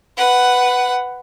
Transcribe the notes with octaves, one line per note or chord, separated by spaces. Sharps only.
B4 F#5